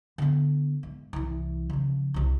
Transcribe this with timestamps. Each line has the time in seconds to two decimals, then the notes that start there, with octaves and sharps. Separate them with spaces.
0.18 D3 B3
0.83 G#2
1.13 C2 E3
1.70 C#3 F3
2.14 C2 C3